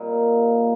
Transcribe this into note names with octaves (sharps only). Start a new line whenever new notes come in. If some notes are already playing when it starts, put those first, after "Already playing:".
Already playing: A#2 G3 A#3 C4 D#4